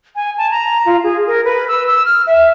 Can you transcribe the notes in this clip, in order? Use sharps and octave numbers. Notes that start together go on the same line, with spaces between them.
G#5
A5
A#5
F4
G#4
A#4
B4
E6
E6
F6
E5